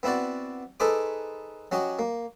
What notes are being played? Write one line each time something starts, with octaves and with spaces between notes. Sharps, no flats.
B3 C4 E4 F#4 D5
D#4 G#4 A4 B4 C5 D6
F#3 C#4 F#4 G4 D#5
A#3